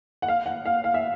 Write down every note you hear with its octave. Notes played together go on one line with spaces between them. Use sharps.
F#5
F5
F#5
F5
F5
E5